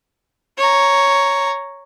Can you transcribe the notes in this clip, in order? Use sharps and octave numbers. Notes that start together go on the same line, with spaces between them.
C#5 A#5